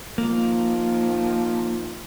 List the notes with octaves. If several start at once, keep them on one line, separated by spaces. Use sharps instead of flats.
D#3 F3 A#3